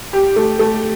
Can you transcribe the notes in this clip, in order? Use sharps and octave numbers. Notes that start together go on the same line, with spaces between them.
G4
A3
A3